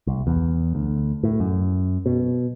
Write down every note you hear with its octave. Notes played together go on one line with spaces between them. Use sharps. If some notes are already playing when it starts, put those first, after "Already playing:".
C2
E2
D2
A2
F#2
B2